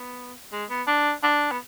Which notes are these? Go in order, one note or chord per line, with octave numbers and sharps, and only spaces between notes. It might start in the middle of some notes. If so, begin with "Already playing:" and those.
Already playing: B3
G#3
B3
D4
D4
B3